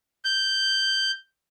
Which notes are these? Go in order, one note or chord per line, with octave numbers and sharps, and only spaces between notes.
G6